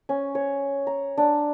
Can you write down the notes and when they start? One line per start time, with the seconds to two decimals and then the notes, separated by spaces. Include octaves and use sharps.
0.09 C#4
0.35 C#5
0.87 A#5
1.18 D4